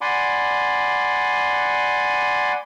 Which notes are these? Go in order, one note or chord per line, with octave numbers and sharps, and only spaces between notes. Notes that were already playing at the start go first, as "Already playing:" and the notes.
D5 F#5 G#5 B5 C6 D6